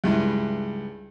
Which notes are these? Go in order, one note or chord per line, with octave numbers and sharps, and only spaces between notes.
C#2 G2 E4